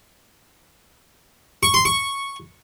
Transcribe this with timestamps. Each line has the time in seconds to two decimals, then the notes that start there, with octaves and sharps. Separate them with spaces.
1.63 C#6
1.74 C6
1.85 C#6